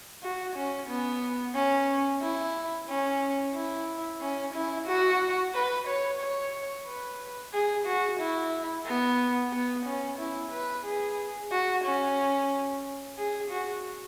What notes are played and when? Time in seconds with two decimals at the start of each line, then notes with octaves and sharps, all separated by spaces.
0.23 F#4
0.56 C#4
0.89 B3
1.55 C#4
2.22 E4
2.89 C#4
3.55 E4
4.22 C#4
4.55 E4
4.87 F#4
5.54 B4
5.88 C#5
6.21 C#5
6.87 B4
7.53 G#4
7.87 F#4
8.20 E4
8.86 B3
9.53 B3
9.86 C#4
10.19 E4
10.52 B4
10.85 G#4
11.52 F#4
11.84 C#4
13.17 G#4
13.50 F#4